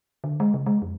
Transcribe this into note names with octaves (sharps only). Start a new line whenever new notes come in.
D3
G#3
C#3
G#3
F2